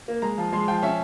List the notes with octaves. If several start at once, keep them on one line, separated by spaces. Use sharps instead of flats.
A#3
G#3 A#5
F3
G#3 C6
F3 G5
C#4 E5